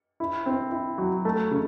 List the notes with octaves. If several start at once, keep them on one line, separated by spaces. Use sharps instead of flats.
E4
C4
E4
F#3
A3
C#3